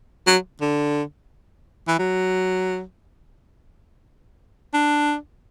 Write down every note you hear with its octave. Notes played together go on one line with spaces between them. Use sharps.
F#3
D3
E3
F#3
D4